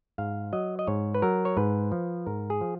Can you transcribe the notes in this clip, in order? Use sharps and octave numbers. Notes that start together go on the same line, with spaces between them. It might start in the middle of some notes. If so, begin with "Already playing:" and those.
G#2 F5
F#3 D#5
D#5
G#2 C#5
B4
F#3 A#4
C#5
G#2 B4
F3
G#2 A#4
G#4
F3